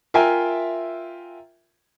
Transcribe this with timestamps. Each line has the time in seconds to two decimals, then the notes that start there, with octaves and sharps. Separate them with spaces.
0.14 F4 A#4 E5 G5 G#5